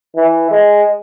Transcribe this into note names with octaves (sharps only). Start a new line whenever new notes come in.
E3
G#3